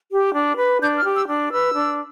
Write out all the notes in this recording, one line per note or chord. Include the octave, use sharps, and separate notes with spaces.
G4
D4
B4
D4 G6
F6
G4
E6
D4
B4 E6
D4